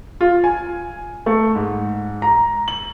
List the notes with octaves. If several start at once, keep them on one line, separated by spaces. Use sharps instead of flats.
F4
G#5
A3
G#2
A#5
F#7